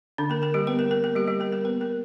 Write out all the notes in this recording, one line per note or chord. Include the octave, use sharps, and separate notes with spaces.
D3 D4
A#3 A#4
A#3 A#4
G3 G4
B3 B4
A#3 A#4
A#3 A#4
A#3 A#4
G3 G4
G3 G4
A#3 A#4
A#3 A#4
B3 B4
A#3 A#4